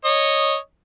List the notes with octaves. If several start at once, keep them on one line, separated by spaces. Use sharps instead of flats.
C#5 D#5